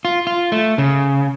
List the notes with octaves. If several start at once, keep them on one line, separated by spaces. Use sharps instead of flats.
F4
F4
A3
C#3